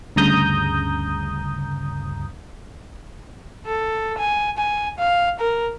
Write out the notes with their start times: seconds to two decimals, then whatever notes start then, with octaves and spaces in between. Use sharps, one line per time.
0.16 D2 G2 C#3 A#5 D#6 G6
3.67 A4
4.18 G#5
4.58 G#5
4.99 F5
5.39 A#4